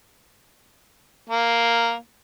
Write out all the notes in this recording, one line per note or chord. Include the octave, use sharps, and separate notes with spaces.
A#3